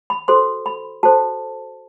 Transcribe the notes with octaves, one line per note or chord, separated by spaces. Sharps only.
B5
F#4 A4 C5 C6
B5
F#4 A4 C5 A5